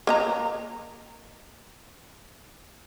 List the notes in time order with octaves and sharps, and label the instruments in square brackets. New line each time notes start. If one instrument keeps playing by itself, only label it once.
[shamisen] A#3 D#5 A#5